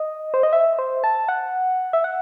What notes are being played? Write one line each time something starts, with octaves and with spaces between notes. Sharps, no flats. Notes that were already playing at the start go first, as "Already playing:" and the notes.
Already playing: D#5
C5
D#5
E5
C5
A5
F#5
E5
F#5